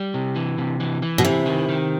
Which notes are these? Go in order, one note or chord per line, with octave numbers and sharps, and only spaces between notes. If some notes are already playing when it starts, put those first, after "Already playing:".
Already playing: G3
C3
E3
C3
E3
E3
B2
C3 E4
D#3
D#3